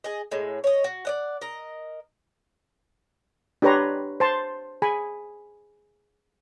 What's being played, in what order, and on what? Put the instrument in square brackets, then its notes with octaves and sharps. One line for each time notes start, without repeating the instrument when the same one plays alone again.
[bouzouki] G#4 D#5
A2 G#3
C#5 D#5
F#4
D5 D#5 F#5
A#4 D#5
[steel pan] D4 G4 B4 C#5 A#5 C6
C5 A5 C6
G#4 G#5 B5